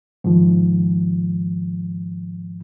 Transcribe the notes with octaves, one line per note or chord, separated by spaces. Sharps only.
G#2 D#3 F3